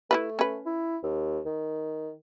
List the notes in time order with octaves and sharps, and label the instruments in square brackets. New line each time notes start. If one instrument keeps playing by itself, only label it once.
[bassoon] A3 [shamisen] E4 F4 B4
[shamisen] C#4 B4
[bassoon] E4
D#2
D#3